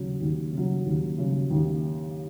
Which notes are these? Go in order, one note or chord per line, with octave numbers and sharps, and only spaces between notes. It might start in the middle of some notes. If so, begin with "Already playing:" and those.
Already playing: D#2 C#3 F#3
D#2
C#3 F#3
D#2
C#3 F#3
D#2